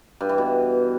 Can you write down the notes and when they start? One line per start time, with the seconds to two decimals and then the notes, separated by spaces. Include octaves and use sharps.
0.21 G2
0.29 E3
0.38 B2